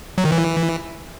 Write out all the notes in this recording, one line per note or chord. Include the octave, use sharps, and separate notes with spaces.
F#3
D#3
E3